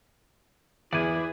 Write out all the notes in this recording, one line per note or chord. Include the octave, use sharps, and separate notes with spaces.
E2 E4 G#4 B4 D5 G#5